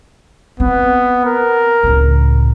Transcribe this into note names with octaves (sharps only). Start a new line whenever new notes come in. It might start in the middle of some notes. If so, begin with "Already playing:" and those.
B3 C4
A#4
C#2 A2